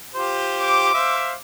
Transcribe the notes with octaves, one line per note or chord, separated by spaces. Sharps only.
F4 G4 C5
D6
C5 E5 F5